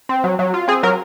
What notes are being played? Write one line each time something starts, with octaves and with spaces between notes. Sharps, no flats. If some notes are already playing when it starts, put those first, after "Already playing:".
C4
F#3
F#3
F4
C4 G#4
F#3 A#4